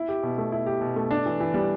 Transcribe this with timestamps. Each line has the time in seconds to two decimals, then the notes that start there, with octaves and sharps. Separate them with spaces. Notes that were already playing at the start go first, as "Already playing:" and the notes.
Already playing: E4
0.09 G4
0.23 B2
0.38 A3
0.52 E4
0.66 G4
0.81 B2
0.96 A3
1.11 D4
1.26 E3
1.40 E3
1.54 G3